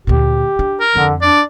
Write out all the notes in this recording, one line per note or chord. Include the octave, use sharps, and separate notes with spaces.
D2 A#2 G4
D4
A#4
F2 D3
D4 D5